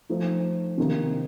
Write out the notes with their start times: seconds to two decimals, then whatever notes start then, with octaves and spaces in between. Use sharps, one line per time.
0.09 F3 A3 D#4
0.77 C3 D#3 A#3 D#4